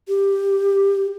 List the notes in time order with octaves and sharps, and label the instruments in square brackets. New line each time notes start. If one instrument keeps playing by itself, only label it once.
[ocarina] G4